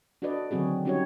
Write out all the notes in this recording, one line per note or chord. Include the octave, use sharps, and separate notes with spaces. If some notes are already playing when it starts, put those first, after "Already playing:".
D4 F#4 A4 B4 D5 D#5
D3 D#3 F#3 C4 F#4 G#4
G3 C#4 D#4 F#4 G4 C#5